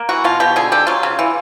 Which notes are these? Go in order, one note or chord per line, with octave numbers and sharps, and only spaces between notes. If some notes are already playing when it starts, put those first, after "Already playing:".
Already playing: A#3
E3 F#4
B2 F4
B2 G4
D3 G#4
D3 G4
F#3 F4
C#3
E3